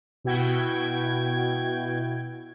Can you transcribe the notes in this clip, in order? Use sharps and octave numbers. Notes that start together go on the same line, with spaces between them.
B2 E4 F#4 G5 G#6